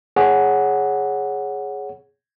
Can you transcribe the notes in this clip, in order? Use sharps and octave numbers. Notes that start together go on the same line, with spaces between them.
G#4 C#5 F#5